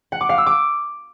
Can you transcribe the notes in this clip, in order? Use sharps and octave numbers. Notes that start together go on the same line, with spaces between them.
F#5
D6
F5
E6
D6